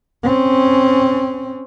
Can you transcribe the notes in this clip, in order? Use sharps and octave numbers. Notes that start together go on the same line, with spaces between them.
C4 C#4